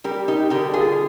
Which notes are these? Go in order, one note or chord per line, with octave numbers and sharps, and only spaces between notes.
G3 G4 A#4
D#4 G4
D3 G4 A#4
F4 G#4